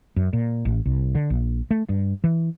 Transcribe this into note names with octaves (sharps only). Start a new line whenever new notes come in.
F#2
A#2
A1
C2
D3
A#1
A3
G2
E3